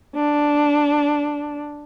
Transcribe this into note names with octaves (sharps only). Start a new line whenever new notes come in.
D4